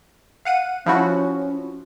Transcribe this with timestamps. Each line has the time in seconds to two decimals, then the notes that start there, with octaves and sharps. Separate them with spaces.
0.45 F5 F#5 D#7
0.86 F3 C#4 E4 F#4